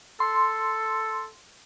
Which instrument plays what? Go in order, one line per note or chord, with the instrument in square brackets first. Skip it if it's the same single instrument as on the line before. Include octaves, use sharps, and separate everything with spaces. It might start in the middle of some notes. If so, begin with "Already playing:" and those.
[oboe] A4 [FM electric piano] C6